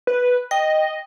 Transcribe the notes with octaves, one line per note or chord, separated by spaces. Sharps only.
B4
D#5 G5